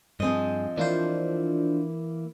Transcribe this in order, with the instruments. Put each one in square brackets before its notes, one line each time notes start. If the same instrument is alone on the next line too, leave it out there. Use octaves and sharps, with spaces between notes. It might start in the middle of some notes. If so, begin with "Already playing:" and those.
[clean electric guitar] G2 G#4 [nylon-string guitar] F3 C4 D#5
[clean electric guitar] E3 A#3 E4 [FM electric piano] D4 F4 C5